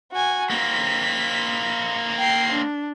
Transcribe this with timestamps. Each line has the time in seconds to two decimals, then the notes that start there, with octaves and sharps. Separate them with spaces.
0.12 F#4 G#5
0.50 A#3 C4 B6
2.19 G5 C7
2.52 D4